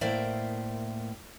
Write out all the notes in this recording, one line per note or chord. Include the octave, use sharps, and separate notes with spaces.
A2 A#3 A#4 C5 D5 E5